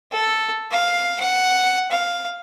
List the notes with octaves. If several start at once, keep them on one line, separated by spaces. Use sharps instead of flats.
A4
F5
F#5
F5